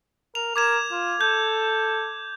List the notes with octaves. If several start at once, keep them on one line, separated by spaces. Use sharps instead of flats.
A#4 F7
A#4 D6 G#6 E7
F4
A4 G6